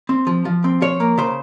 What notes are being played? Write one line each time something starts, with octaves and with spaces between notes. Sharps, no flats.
C4
F3
F3
C4
F3 C#5
A#3
C#3 C5